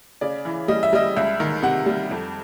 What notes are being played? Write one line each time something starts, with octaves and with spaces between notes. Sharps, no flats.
C#3 D5
E3
G3 D#5
E5
G3 D#5
C#2 E5
D#3
C3 F#5
G3
F2